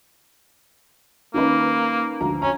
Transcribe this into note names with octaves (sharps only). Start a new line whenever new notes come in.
D#3 A#3 C#4 B4
D2 F3 A#5
C#4 A#5